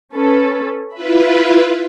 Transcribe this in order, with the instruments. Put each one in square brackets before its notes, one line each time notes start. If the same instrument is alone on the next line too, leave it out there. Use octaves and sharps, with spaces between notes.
[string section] C#4 A4 B4
[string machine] E4 F4 B4 [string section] E5 B5